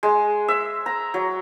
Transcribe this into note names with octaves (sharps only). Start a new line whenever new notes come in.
G#3
E5
A#5
F#3